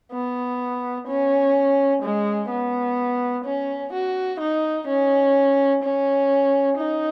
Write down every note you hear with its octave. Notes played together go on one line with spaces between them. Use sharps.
B3
C#4
G#3
B3
C#4
F#4
D#4
C#4
C#4
D#4